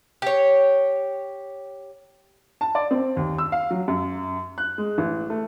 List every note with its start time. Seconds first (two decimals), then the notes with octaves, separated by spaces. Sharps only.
0.22 G4 C#5
2.61 A5
2.75 D5
2.91 C4
3.17 D#2
3.38 E6
3.52 F5
3.71 F#3
3.88 F#2
4.58 F#6
4.78 G#3
4.98 A1
5.30 A3